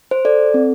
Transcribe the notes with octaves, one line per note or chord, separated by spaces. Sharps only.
C5
A4 D5
C4